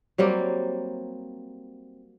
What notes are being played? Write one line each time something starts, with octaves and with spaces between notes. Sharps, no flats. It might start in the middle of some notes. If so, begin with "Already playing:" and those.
F#3 G3 A#3 C4